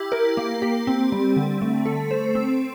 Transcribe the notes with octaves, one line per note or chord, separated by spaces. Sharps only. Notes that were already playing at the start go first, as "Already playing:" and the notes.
Already playing: E4 G4
A#4
A#3
G4
C4
G3
D3
A3
A4
C5
C4